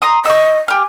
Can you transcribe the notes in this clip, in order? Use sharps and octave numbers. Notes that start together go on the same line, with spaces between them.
A#5 C6 D#6
D#5 C#6 E6
G4 G#5 F6